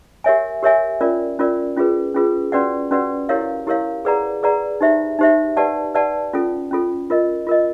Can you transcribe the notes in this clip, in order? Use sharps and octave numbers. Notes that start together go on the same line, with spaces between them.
G4 A#4 C#5 E5 G#5
G4 A#4 C#5 E5 G#5
C#4 F4 A#4 D5
C#4 F4 A#4 D5
C#4 F4 G#4 B4
C#4 F4 G#4 B4
C#4 F#4 B4 D5 F#5
C#4 F#4 B4 D5 F#5
E4 G4 A#4 C#5 F5
E4 G4 A#4 C#5 F5
G#4 B4 D5 F#5 A#5
G#4 B4 D5 F#5 A#5
D#4 G4 C5 E5
D#4 G4 C5 E5
G4 B4 D5 F#5 A5
G4 B4 D5 F#5 A5
C#4 F4 A4
C#4 F4 A4
F4 A#4 D#5
F4 A#4 D#5